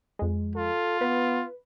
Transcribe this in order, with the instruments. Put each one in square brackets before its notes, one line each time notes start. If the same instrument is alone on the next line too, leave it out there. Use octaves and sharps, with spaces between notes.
[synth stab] F2 G#3
[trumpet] F4 [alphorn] A4
[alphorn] B3 [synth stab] B4